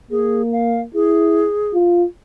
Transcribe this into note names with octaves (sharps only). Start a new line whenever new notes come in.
A#3 G#4
F5
E4 G#4
F4